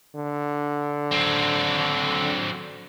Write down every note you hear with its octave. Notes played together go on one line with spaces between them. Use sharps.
D3
F#3 C4